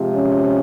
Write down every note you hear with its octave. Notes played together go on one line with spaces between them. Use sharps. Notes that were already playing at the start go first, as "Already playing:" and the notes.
Already playing: C3 F3 G#3
C#4